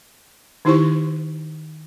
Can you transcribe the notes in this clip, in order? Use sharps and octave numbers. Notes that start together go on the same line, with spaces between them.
D#3 D#4 E4 G4 C5 C#6